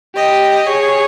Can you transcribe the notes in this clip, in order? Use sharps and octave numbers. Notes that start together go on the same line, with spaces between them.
G4 D#5
G#4 C#5